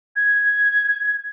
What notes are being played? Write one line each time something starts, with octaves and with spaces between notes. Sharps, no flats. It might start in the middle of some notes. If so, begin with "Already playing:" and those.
G#6